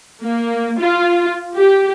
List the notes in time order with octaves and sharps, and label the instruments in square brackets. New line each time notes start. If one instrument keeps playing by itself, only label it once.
[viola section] A#3
F4
G4